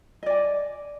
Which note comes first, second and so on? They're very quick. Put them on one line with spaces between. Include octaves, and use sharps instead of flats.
D#5 D5 G#5